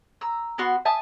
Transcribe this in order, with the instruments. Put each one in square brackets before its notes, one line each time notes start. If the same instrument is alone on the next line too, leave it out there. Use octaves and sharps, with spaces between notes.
[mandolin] A#5 E6
B3 F#4 C6
E5 G#5 A5 D#6